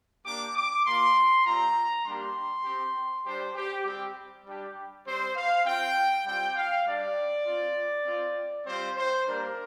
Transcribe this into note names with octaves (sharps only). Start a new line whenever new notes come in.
A#3 D4 G4 D6
D6
A#3 F4 C6
G3 C4 F4 A#5
G3 A#3 D4 G4 C6
C4 G4
G3 D4 G4 C5
G4
G3 C4 G4
G3 D4 G4
G3 C4 G4 C5
F5
C4 F4 G5
G3 C4 F4 G5
F5
G3 D4 G4 D5
C4 F4
C4 F4
G3 C4 F4 C5
C5
G3 A#3 D4 G4 A#4